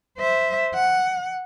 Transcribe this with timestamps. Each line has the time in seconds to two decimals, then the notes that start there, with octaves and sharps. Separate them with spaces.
0.18 C5 E5
0.75 F#5